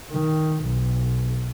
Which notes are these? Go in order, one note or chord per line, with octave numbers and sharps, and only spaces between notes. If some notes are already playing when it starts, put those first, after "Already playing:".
D#3
B1